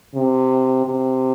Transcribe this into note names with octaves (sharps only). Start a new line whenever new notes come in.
C3
C3